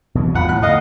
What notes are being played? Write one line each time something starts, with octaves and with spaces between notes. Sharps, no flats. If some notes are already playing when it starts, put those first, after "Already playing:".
B2 E3 G#3
E2 G2 B2 F4 F#5 B5
A2 F#6
D3 D#5 F5 F#5